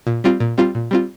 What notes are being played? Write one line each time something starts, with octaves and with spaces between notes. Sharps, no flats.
A#2
G3 C4 F4
A#2
G3 C4 F4
A#2
G3 C4 F4